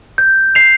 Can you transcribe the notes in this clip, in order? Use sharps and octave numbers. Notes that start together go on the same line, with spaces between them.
G6
C7 F7